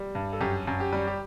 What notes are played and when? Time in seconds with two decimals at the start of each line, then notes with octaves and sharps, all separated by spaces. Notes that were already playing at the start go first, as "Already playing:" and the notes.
Already playing: G3
0.15 G2
0.33 A4
0.40 F#2 G4
0.67 F#2
0.80 G4
0.93 G3
1.07 G4